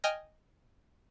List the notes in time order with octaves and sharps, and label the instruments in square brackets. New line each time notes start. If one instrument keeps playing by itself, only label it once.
[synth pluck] D#5 G5 G#5 F6 A#6